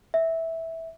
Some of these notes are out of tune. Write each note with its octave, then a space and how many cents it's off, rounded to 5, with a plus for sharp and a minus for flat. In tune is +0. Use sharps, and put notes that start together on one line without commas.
E5 -10